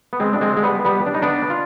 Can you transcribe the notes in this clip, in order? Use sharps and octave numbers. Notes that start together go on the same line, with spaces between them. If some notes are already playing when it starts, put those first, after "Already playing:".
B3
G#3 C4
D4
G#3 C4
G#3
G3 B3
G3 B3
D4
D#4
B3 D4
F4